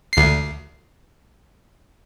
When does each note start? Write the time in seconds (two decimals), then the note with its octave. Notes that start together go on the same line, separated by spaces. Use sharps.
0.13 D2 C7